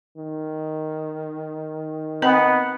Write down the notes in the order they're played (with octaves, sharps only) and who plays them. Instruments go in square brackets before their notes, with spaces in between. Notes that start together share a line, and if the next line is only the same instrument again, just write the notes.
[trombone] D#3
[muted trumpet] B3 [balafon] C4 D#5 A#5